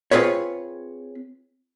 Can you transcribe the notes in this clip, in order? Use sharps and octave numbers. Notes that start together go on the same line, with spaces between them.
C4 F4 G#4 B4 C#5